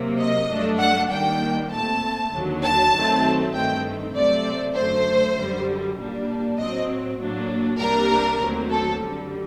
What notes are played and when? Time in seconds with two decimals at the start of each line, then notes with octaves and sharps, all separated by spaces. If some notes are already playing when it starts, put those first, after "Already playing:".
Already playing: C3 F#3 A#3
0.19 D#5
0.49 G2 F#3 A3 D4
0.79 F#5
1.10 D#2 D#3 G3 A#3 D4 G5
1.70 A#2 A3 C4 A5
2.32 D#2 D3 F#3
2.63 A5
2.93 F#2 D#3 F#3 A3 C4
3.53 G2 D#3 A3 C4 G5
4.15 C3 F#3 A3 C4 D5
4.75 F#2 D3 A3 C5
5.36 F#2 D3 G3
5.98 A#2 G3 A#3 D4
6.58 A2 F#3 C4 D#5
7.19 A2 F#3 A#3 D4
7.79 C2 C3 G3 A#3 D4 A#4
8.40 D#2 D3 F#3 A3 C4
8.70 A4
9.02 F#2 D3 G3